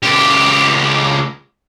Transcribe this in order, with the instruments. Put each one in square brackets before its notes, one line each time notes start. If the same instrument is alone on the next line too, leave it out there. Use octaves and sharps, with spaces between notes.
[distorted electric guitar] C#2 G4